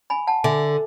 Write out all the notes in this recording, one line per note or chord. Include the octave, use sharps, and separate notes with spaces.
G#5 B5
F#5 A5
D3 E5 G#5